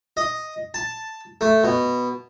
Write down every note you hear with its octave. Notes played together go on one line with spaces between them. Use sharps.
D#5
A5
A3
B2